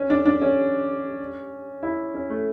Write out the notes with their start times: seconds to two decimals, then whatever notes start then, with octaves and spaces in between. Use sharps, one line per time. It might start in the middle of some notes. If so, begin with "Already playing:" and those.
Already playing: C#4
0.10 D4
0.25 D4
0.42 C#4
1.83 E4
2.14 C#4
2.30 A3